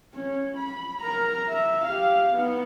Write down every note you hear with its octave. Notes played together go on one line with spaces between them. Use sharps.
C#4
B5
A#4 A#5
E5
G4 F5
B3 D#4